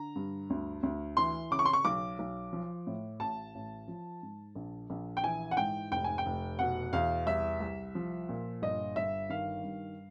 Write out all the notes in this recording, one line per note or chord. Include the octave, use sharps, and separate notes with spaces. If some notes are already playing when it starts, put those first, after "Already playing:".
Already playing: D3 A#5
G2
D2
D2
E3 C6
C#3 D6
C#6
C6
C#6
B1 D6
B1
F3
A2
A1 A5
A1
F3
G#2
A#1
A#1
G5
E3 G#5
F#5
G#2 G5
F1 G5
G#5
G5
F1
B2 F#5
E2 F5
C2 E5
C2
F3
A#2
G1 D#5
G1 E5
D#3 F5
G2